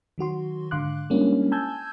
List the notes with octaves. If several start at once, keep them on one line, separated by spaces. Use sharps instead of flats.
D#3 F#3 F#4 C6
G#2 D3 F5 C6 D6 F#6
G3 G#3 A#3 C#4 D4 E4
G#5 A5 E6 G6 G#6